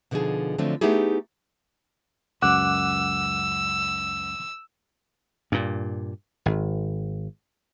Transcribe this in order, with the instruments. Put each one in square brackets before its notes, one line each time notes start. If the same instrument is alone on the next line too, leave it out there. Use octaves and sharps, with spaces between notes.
[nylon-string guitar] B2 D3 F3 D#4 G#4
D3 F3 F#3 A3 C4 D4
A3 B3 D#4 E4 G4 G#4
[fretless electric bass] C#2 F#2 [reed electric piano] F#5 D6 F#6 [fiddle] E6
[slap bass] G2 A#2
G#1